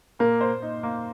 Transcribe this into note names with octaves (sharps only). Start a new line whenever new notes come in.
A#2 A#3
C5
D#4
A#3